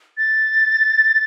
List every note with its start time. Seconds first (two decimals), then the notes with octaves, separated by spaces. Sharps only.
0.17 A6